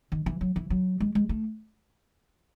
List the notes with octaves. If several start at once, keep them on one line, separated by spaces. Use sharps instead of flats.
D#3
E3
F#3
E3
F#3
G#3
G#3
A3